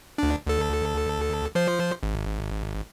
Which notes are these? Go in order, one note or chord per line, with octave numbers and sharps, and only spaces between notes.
D2 D4
D2 A4
F3 C5
G#1